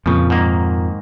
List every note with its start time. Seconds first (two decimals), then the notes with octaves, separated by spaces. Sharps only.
0.06 F2 A#2 C#3 F3
0.30 G#2 D#3 A#3